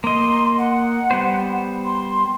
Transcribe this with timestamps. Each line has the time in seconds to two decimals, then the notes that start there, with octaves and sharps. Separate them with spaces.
0.04 A#3 D#5 C6
0.58 F#5
1.11 G3 B3 C5
1.85 C6